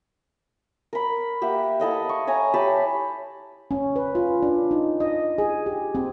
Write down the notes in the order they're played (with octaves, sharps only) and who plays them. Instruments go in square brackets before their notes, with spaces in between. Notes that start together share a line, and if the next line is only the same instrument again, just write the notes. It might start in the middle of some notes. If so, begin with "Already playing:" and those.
[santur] A#4 B5
A#3 G4 E5 F#5
E4 A4 D#5 F5
C#6
C#5 E5 G#5 A#5
G4 A5 B5
[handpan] C#4
B4
F4
D4
D#4
D#5
G#4
G4
C4